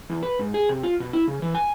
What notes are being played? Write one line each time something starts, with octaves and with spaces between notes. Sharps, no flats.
E2
B4
G#2
G#4
C3
F4
B2
E4
C#3
E3
G#5